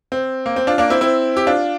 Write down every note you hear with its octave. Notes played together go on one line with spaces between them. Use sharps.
C4
A#3
C4
D4 F4
A#3 D4
C4 E4
C4 E4
G4
D4 F4